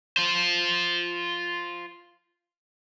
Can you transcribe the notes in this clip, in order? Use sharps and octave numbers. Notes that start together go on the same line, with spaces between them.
F4 C5